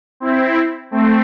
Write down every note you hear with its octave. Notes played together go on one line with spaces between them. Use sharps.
C4 E4
A3 C4